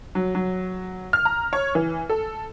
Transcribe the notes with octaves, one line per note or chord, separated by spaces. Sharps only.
F#3
F#3
F6
A#5
C#5
E3
A4